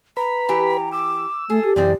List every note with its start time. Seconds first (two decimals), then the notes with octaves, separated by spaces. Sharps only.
0.17 B4 A#5 B5
0.49 E3 G4
0.92 D6 E6
1.50 A3 G#4 A4
1.65 G4
1.76 F#2 C3 E3 G#3 C4 D5